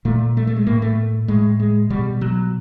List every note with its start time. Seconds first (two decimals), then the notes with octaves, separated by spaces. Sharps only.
0.05 A#2 A3
0.37 A3
0.47 A3
0.56 G#3
0.67 A2 A#3
0.82 A3
1.28 A2 G#3
1.60 G#3
1.90 B2 G3
2.21 F#3